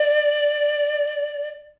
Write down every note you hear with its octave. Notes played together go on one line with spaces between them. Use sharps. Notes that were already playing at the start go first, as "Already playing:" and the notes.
Already playing: D5